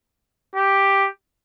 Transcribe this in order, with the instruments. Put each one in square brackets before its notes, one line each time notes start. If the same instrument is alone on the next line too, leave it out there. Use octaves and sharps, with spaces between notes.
[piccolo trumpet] G4